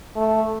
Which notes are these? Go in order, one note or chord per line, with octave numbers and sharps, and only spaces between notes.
A3